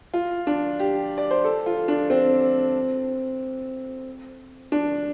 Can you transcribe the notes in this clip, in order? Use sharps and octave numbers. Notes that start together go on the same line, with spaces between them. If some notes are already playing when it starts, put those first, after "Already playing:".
F4
D4
G4
D5
C5
A4
F4
D4
C4
D4